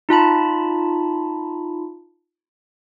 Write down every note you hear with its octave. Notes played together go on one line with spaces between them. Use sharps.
D#4 F4 A5 B5